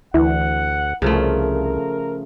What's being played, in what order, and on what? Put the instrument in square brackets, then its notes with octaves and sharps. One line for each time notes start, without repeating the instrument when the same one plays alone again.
[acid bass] D2 [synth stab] E3 [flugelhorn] F#5
[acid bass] C2 [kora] C#3 F3 A3 [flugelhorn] A#4